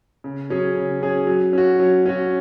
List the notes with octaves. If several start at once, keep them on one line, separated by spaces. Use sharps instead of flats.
C#3
F#3 C#4 G#4
C#3
F#3 C#4 G#4
F#3
C#4 F#4
F#3
C#4 F#4